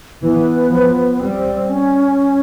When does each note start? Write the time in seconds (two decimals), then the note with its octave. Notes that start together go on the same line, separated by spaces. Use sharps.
0.22 E3 B3
0.70 F3
1.20 G3 C4
1.69 C#4